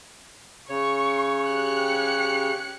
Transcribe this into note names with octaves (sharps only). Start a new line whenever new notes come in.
C#3 C#5 C#6
G4 F#6 C#7